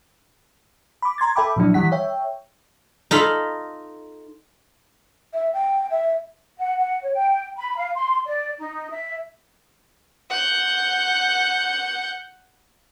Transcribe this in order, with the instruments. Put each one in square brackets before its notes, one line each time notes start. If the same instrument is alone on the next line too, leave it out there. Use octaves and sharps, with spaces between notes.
[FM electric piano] B5 D6
A#5 C6 G#6 A6
A4 E5 G5 B5 D6
A#2 F3 F#3 D4 E4
D#3 E3 G3 E4 F#5 B6
C#5 E5 G5
[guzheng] D#4 F4 A4 B5
[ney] E5
G5
E5
[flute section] F#5
F#5
C#5
G5
B5
F5
C6
D5
D#4
E5
[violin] F#5 G6